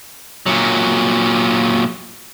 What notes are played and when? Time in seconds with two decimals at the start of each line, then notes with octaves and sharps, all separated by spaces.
0.46 A#2 F#3